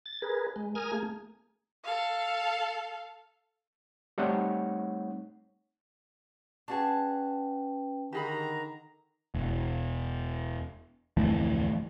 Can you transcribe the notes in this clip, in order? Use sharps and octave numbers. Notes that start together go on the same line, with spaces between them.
A6
G#4 A#4 B4
G#3
A#4 G#5 D#6 F6
A3 A#3 G#4
A4 F5
G3 A3 C4 D#4 C#5 F#5
C#4 D4 F#4 G#4 B4 G5 A5
D3 D#3 G4 G#4 A#5 B5
E1
D1 F2 E3 A3